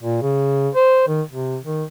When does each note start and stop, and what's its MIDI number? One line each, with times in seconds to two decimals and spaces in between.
0.03 0.21 46
0.22 0.69 49
0.75 1.06 72
1.08 1.22 51
1.30 1.58 48
1.63 1.84 51